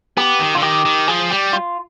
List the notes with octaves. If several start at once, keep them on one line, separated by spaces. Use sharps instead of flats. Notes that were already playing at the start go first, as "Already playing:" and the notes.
B3 G4
D#3
D3 F4
D#3 G4
D#3
F3 G#4
G3 G4
F4